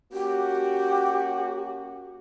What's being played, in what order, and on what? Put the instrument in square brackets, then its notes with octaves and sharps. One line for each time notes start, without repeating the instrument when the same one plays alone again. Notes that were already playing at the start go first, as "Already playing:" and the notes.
[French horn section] A#3 C#4 F#4 [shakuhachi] G4